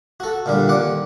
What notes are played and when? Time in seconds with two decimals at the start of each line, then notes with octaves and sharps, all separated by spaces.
0.20 F#4 A4
0.46 A#2 D3 G3
0.68 D#2 F#5 D6